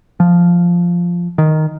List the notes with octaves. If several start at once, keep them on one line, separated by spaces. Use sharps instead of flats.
F3
D#3